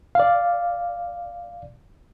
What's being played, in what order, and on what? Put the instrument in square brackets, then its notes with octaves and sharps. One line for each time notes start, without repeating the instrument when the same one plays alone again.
[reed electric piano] D5 F5